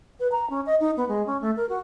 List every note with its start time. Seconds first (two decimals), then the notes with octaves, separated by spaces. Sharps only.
0.20 B4
0.32 A#5
0.50 C#4
0.66 D#5
0.80 D#4
0.97 B3
1.08 G#3
1.26 C#4
1.41 A3
1.56 A#4
1.69 F#4